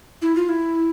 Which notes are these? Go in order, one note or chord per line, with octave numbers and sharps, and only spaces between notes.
E4
F4
E4